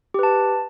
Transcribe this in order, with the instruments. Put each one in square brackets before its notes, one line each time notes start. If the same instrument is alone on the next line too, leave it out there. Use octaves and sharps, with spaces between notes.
[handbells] G4
B4
A5